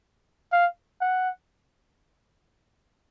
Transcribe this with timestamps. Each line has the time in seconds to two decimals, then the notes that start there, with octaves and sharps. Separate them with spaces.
0.52 F5
1.01 F#5